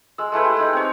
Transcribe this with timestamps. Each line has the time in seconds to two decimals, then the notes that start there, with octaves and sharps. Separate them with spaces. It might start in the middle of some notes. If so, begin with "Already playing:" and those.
0.18 G#3 E6
0.32 G#3 A3 E4 B4
0.44 G4
0.57 G#3 D#4
0.73 C4 C#5